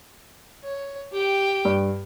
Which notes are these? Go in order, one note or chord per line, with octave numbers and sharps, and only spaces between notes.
C#5
G4 G5
G2